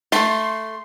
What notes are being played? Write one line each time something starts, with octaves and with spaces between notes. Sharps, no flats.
A3 C6